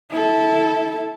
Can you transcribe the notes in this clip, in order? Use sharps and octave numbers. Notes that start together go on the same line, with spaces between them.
E4 A4